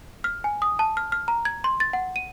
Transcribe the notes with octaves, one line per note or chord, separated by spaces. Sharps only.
F6
G#5
D#6
A5
F6
F6
A#5
G#6
C6
A6
F#5
D#7